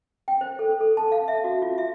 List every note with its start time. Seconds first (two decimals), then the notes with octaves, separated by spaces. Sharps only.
0.28 G5
0.41 C5
0.59 A4
0.80 A4
0.97 A5
1.12 F5
1.28 E5
1.44 F#4
1.62 F4
1.78 E5